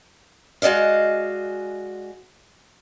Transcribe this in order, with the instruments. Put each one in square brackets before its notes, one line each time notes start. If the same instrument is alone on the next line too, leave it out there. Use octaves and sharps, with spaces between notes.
[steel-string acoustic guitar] G#3 F#4 D5 D#5 F5